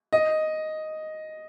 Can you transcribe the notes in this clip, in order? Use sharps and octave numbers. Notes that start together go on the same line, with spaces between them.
D#5